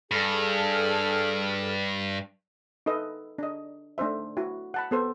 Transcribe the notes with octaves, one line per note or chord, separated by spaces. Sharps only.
G2 G#4 A4 F6
D#4 A4 B4 D#5 E5
D4 D#5
A3 D4 D#4 C5 E5
E4 F#4
F#5 A5 B5
B3 A4 C5